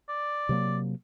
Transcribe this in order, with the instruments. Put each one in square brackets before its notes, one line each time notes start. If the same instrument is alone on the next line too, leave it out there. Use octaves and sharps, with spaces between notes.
[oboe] D5
[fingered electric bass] C3 F#3 A#3